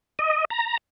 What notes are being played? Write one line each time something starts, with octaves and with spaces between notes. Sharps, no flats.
D#5
A#5